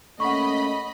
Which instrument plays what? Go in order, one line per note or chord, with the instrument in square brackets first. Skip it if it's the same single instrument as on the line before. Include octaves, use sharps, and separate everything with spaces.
[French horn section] A3 A#3 C#4 [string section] D#5 B5 [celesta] F#5 C#6